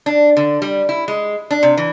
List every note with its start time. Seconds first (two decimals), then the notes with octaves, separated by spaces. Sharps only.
0.06 D4
0.37 D3
0.62 G3
0.89 E4
1.08 G#3
1.51 D4
1.63 C3
1.77 E3